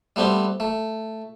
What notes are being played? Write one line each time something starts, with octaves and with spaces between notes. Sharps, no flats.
G3 A3 B3 C4 G4
A3